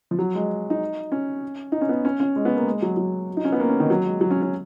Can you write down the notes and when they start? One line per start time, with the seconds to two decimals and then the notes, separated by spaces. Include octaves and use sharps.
0.11 F3
0.19 F#3
0.35 G#3
0.70 D#4
1.12 C#4
1.72 D#4
1.81 C#4
1.89 B3
2.05 C#4
2.20 C#4
2.36 G#3
2.45 B3
2.57 A#3
2.66 G#3
2.82 F#3
2.97 F#3
3.37 D#4
3.45 C#4
3.52 B3
3.60 A#3
3.69 C#4
3.80 D#3
3.90 F#3
4.05 G#3
4.21 F#3
4.31 C#4
4.42 C#4